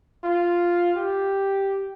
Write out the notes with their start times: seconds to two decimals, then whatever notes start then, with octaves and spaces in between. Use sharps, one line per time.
0.24 F4
0.96 G4